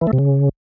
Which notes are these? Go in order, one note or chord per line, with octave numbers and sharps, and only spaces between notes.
E3
A3
C3
C#3